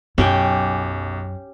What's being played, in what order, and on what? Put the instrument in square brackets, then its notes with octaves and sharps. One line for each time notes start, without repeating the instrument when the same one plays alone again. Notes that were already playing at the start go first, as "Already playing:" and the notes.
[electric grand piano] B1 [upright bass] F#2 [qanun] C#4 G4 G5